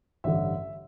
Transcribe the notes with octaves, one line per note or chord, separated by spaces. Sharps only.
A1 G2 D3 E5